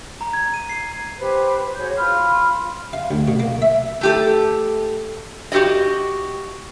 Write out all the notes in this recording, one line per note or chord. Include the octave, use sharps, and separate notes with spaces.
A#5
G#6
D#7
C7
G4 B4 C5
F#4 G#4 C#5 G6
F4 B5 C6 F6
F5
D2
B2
A#3
E5
A3 G4 A4
F#4 G4 A4 D5 D#5